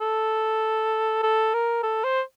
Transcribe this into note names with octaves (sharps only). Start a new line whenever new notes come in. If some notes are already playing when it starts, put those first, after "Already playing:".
A4
A4
A#4
A4
C5